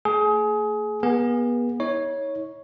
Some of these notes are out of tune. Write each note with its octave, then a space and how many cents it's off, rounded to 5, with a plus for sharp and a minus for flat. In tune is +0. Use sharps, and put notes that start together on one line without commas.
A3 +45 G#4 +25
B3 -35 G#4 -20
D#4 +45 C#5 +0